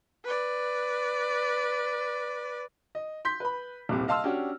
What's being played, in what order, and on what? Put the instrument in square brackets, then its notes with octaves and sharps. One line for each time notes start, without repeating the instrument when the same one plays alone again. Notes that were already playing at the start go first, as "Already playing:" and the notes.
[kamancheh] B4 D5
[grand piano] D#5
C6 G6 B6
B4 B5
D#1 C2 C3
D#5 F5 A5 C6 E6 F6
C#4 D4 F#4 G4